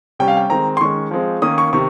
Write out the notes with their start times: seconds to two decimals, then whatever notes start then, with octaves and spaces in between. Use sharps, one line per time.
0.19 C3 G3 C#4 G5
0.28 F5
0.37 G5
0.49 D#3 G#3 C4 A#5
0.77 C6
0.81 D#3 G#3 C#4 C#6
1.11 F3 G#3 C4
1.42 D#3 A#3 C#4 D#6
1.58 C#6
1.73 C3 D#3 C#6